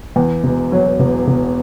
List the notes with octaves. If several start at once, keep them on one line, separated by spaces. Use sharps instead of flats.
E2
E1
F#3
E1
E1